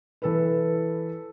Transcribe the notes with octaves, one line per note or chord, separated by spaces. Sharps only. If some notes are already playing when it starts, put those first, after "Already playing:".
E3 A4 B4